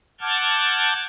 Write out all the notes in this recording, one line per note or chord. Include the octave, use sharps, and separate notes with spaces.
F#5 A5 D6 F6 G6 G#6